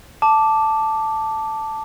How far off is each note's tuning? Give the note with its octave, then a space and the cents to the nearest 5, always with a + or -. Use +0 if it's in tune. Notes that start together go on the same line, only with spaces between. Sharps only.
A5 +0 D6 +0